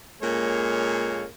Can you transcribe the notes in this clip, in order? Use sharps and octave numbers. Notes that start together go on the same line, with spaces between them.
A#2 G#3 A#3 C#4 A4 C#5